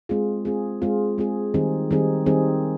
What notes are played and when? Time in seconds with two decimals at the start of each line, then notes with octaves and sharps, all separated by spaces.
0.09 G#3 C4 F4 G#4
0.45 G#3 C4 F4 G#4
0.82 G#3 C4 F4 G#4
1.18 G#3 C4 F4 G#4
1.54 D#3 G3 C4 D#4 G#4
1.91 D#3 G3 C4 D#4 G#4
2.26 D#3 G3 C4 D#4 G#4